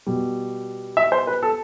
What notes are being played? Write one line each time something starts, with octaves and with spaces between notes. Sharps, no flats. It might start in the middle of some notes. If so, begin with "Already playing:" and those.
B2 G3
E5
C5
B4
A4